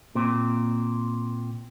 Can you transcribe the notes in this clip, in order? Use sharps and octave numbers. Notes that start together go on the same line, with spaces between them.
A#2 C4